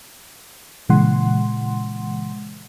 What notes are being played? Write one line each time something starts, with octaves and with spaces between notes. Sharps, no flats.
A#2 C#3 E3 G#3 F#5 C6